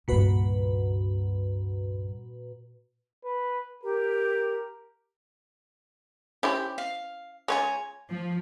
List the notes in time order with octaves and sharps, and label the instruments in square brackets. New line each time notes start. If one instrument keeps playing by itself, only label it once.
[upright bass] C#2 G2 [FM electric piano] A#2 F#4 B4
[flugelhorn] B4
[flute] G4 [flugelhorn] A#4
[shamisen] C#4 E4 C5 [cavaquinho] G4
[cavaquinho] F5
[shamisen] G#3 C#4 F4 [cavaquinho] C#5 G#5 A#5
[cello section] F3